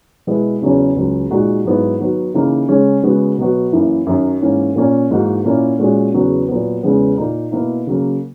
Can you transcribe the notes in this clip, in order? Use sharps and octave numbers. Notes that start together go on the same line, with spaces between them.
B2 G#3 B3 E4
E2 C#3 F#3 C#4
C#2 C#3 F#3
A#2 G#3 D#4 F#4
G#2 F#3 B3 E4
D#3 F#3 B3 F#4
C#3 E3 A#3 D#4
C#3 G#3 C#4
C#3 G#3 B3 F#4
B2 F#3 B3 F#4
F#2 E3 A#3 E4
F#2 D#3 F#3
G#2 E3 A#3 C#4
A#2 A#3 C#4
G#2 E3 A#3 D#4 F#4
A#2 A#3 C#4 E4
A#2 G#3 C#4 F#4
E2 C#3 F#3 B3 F#4
A#2 F#3 B3
E2 C#3 G#3 B3
A#2 A#3 D#4
B2 A#3 E4
C#3 F#3 A#3